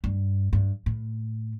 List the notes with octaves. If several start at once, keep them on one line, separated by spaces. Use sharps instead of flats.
G2
G2
A2